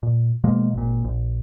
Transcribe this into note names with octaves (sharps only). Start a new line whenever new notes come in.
A#2
B2 F3 G#3 A#3
G#1 A#2
A#1